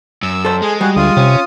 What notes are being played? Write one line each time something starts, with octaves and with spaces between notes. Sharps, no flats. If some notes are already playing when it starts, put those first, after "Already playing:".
F#2 E6
A4 C5
G#3 G#4
G3 F#4 G#4
D2 F4 D#6
C3 C#4